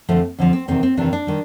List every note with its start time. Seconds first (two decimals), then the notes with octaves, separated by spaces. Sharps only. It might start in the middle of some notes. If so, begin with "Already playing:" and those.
0.09 F2 D3 F3 A3
0.39 F2 D3 F3
0.53 C4
0.68 E2 C3 D#3 C4
0.83 C4
0.97 E2 C3 D#3 D4
1.13 D4
1.27 D#3 G3